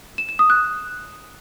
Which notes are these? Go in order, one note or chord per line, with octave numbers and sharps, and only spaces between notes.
E7
E7
D#6
F#6